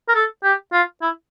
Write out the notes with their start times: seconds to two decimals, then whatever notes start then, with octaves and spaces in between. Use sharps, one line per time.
0.08 A#4
0.15 A4
0.43 G4
0.73 F4
1.02 E4